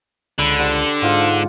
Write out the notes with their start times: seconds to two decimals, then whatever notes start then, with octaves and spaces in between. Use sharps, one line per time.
0.38 C#2 D3 B5
0.59 G3 C5 F#5
1.02 G#2 F4 F#5 D6